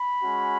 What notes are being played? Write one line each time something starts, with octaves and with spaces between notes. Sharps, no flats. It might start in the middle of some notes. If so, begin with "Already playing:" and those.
Already playing: B5
G#3 C#4 F#4